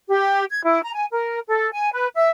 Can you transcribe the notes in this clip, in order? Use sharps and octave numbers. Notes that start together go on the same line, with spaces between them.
G4
G#6
E4
A#5
G#5
A#4
A4
G#5
B4
E5